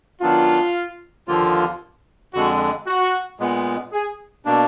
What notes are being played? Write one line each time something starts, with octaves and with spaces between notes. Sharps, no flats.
D#3 F#3 B3 D4 F4
D#2 D3 F3 A#3 F4
F2 D3 G#3 F#4
F#4
A#2 G#3 B3
G#4
B2 A#3 D4